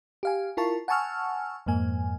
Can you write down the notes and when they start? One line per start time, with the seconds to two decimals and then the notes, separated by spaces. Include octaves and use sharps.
0.23 G4 F5 G#5
0.57 E4 F4 A#4 A5 C#6
0.88 F#5 G#5 A5 C#6 E6 F6
1.66 F2 G#2 A#3 G#5